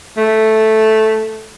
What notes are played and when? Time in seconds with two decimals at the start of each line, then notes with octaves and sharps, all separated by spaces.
0.17 A3